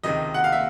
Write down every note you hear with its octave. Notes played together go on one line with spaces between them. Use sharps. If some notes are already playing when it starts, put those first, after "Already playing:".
C#2 C3 D#3 D#5
F#5
F5
E5